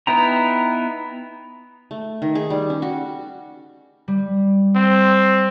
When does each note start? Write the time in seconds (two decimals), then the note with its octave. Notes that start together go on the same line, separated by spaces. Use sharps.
0.07 B3 D#4 E4 G5 A#5
1.91 A3
2.22 D#3
2.35 G#4
2.50 G3
2.70 C#4
2.82 F#4
4.08 G3
4.76 C4